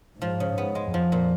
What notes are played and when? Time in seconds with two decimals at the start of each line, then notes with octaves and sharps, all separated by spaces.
0.22 G#2 F3
0.40 C#3
0.58 G#2 B3
0.75 G#3
0.94 F2 F3
1.12 A#2